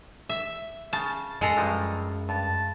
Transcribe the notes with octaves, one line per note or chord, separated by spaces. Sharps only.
E5
C#3 A5
F#2 G#3 A4 A#5
G2 F3 F#3
G2 A5